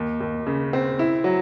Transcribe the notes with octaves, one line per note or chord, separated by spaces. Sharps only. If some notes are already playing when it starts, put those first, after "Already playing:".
Already playing: D#2
D#2
C#3
C4
E4
F#3